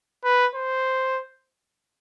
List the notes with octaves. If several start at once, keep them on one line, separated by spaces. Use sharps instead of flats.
B4
C5